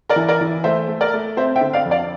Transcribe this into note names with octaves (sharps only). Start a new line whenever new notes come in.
A#4 D5
E3
A#4 D5
E3
A3 C5 E5
A3
A#4 D5
A3
C4 C5 E5
E5 G5
D3
D5 F5
F2
D5 F5